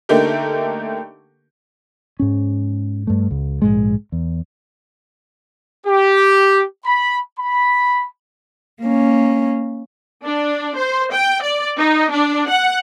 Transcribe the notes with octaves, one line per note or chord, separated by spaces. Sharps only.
D3 A3 A#3 D#4 G4 A#4
G#2 C#4
G2 A3
C#2
A#1 G#2 G#3
E2
G4
B5
B5
A#3 C#4
D4
C5
G5
D5
D#4
D4
F#5